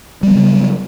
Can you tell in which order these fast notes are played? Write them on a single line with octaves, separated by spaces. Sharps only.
G3 B3 F#3 C#3